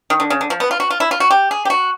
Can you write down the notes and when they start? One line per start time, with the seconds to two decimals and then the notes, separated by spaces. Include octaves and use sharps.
0.10 D#3
0.20 D3
0.30 C#3
0.41 D3
0.50 F3
0.60 B3
0.71 F4
0.80 F#4
0.90 F4
1.00 E4
1.11 F4
1.20 F#4
1.30 G4
1.51 G#4
1.65 G4
1.70 F#4